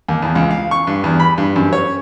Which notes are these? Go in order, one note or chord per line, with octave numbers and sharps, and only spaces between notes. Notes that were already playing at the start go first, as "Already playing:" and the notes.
D#2
E2
C#2
F5
C#6
G2
E2
B5
G2
F#2
C#5